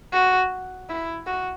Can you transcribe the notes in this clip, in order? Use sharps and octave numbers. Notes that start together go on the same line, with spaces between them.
F#4
E4
F#4